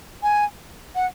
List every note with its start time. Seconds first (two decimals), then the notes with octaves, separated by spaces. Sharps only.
0.23 G#5
0.95 F#5